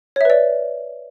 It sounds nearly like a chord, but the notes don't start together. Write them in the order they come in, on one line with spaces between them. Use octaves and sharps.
C#5 E5 B4 D5